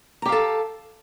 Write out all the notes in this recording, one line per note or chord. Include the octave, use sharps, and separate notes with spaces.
G4 A4 F5 A#5